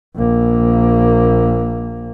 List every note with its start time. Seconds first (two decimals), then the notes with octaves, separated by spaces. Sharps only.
0.16 A#1 A#3